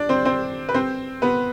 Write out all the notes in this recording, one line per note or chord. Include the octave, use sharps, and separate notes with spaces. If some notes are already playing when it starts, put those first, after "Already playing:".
Already playing: D4 D5
C4 C5
C4 C5
B4
C4 C5
B3 B4